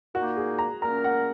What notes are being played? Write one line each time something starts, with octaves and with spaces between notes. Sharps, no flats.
A#2 A#3 D#4 F#4
G#4
A#5
A#2 A#3 C#4 A#4 A#5
F#5